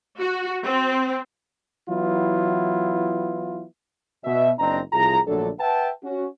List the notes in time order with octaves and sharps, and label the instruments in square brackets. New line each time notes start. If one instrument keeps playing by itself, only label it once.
[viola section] F#4
C4
[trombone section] E3 F#3 B3 E4 F4
[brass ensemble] B2 E5
F#1 C4 D4 D#5 A#5
C2 F3 F4 G#4 A#5
A#1 D3 F#3 A3 D4 A4
B4 E5 F#5 G5 A5
C#4 F#4